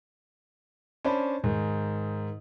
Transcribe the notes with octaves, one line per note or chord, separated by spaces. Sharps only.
C#4 D4 C5 D5 A5 B5
G#2 D#3